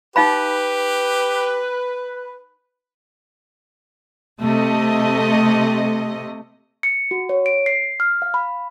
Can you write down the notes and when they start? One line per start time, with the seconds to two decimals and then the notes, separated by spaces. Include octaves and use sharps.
0.16 D#4 G4 B4 F5 B5
4.41 C3 A3 D#5
6.83 C#7
7.11 F#4
7.29 C#5
7.46 D7
7.66 C7
8.00 F6
8.22 F5
8.34 B5